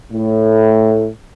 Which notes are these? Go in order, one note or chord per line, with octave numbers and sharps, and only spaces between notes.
A2